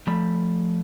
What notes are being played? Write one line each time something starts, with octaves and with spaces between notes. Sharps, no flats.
F3 A3 B5